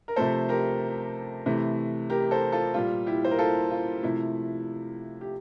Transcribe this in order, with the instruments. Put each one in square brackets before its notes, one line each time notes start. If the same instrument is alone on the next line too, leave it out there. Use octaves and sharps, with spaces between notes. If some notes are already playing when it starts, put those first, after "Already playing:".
[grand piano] A#4
C3 F3 A3 A4 C5
G4 A#4
C3 E3 A3
G4 A#4
A4 C5
F4 A4
A#2 G3 F4
E4 G4
C5
A#4
F4 A4
F4
C3 F3 A3 E4
G4